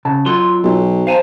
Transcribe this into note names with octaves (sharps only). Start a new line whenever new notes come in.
C#3 A5
F#3 F4 A4 C6
B1
C5 F5 G#5 A5